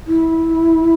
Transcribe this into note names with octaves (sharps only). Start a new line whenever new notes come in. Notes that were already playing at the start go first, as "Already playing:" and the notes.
E4